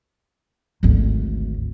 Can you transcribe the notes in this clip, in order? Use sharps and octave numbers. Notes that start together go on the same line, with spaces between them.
G#1 D2